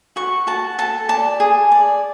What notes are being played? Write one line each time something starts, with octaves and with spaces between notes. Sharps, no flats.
F#4 C#6
F#4 A5
A4 A5
D5 A5
G#4
D5